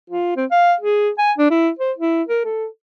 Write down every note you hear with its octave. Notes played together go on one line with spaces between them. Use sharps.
F4
C4
F5
G#4
G#5
D4
E4
C5
E4
A#4
A4